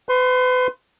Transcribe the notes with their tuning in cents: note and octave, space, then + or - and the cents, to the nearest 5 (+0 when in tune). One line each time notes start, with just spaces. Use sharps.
B4 +35 C6 +15